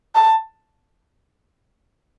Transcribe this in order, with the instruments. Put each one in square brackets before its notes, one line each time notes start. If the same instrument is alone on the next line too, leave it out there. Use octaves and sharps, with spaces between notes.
[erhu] A5